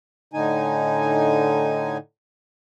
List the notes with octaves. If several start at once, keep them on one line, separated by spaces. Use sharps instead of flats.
A2 D3 D#4 G#5